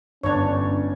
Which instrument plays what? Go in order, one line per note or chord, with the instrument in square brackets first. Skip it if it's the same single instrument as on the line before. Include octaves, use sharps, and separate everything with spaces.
[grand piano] G1 [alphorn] C#4 [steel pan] D4 C#5